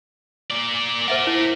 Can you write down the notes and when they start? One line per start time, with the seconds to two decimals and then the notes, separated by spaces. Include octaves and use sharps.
0.50 A#3 D5
1.08 A#4 C5 D5 E5 F#5
1.27 E4